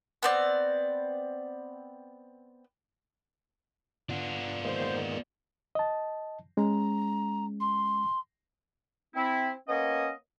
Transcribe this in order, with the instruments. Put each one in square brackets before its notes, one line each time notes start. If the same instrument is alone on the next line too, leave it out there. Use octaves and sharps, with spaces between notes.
[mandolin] B3 C4 D5
[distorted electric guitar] B3 F4 [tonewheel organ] D4 [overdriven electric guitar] D5 F#5
[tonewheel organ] D#3 G#3 A#3 [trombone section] C5
[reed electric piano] D#5 A5
[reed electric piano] G#3 C#4 [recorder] A#5
[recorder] C6
[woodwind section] C4 E4
A#3 B3 C#4 C#5 D#5